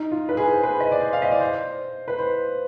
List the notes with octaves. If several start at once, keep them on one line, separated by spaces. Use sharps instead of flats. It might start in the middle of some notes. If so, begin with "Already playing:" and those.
Already playing: D#4
F4
B4
G#4
C5
B4
D#5
D5
C5
F5
D#5
D5
C5
B4
C5